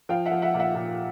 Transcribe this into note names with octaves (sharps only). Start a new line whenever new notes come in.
F3 F5 G5
E5 F#5
F3
E5 F#5
A#2
E5 F#5
A#2